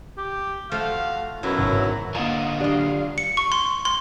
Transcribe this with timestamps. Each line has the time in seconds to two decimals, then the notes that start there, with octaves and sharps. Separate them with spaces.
0.17 G4
0.71 F3 A3 F#4 F5
1.43 F#2 B2 E3 F#3 E4
1.58 G#1
2.15 D3 A#3 F4 D#5 F#5 A5 A#5
2.60 F#3 D4 G4 D#5 F5
3.18 C#7
3.37 C#6
3.52 C6
3.85 C6